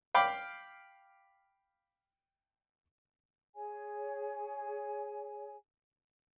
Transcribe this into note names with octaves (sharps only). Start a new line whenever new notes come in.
F5 G5 B5 D6
G#4 C#5 G#5